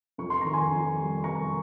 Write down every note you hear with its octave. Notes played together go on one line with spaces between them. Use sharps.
F2 C#6
C6
D#3 A#5
G#5 C6
F2
G3
G3 A#5 C#6